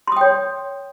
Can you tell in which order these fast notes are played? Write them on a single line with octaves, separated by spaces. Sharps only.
C6 D#6 G5 C#5